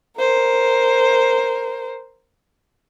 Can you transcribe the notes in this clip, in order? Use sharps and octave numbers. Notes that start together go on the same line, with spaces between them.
A#4 C5